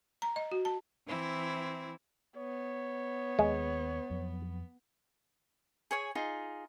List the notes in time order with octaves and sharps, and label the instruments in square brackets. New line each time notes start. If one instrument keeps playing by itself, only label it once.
[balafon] A#5
D#5
F#4
A5
[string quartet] E3 C4 E4
[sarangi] B3 [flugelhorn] C#5
[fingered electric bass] D#2 [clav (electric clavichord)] G#3
[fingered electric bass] F2 F#3
[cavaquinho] G#4 C#5 G#5
D#4 F4 G#4